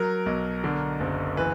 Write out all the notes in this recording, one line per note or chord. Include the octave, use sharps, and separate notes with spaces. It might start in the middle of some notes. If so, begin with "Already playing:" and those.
Already playing: F#3 A#4
B1
D3
F#1
E3 B4